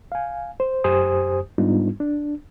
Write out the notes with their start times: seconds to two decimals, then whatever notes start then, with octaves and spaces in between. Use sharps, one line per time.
0.12 F5 G#5
0.60 C5
0.84 F#2 G4 C5 G#5 D#6
1.58 G#2 G3 B3 D4 D#4 F4
2.00 D4